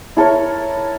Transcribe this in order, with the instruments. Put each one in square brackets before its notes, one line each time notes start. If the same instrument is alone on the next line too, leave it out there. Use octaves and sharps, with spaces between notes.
[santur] E4 A4 A#4 C#5